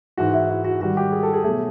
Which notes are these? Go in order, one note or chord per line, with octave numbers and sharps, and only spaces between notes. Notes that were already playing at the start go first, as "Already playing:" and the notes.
G#2 E3 G#3 F#4
E4
E4
F#4
G#2 D#3 G3 F#4
G4
G#4
A4
G#4
B2 F#3 A3 G#4